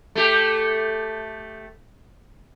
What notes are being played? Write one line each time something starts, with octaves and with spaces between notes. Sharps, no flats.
A3 G4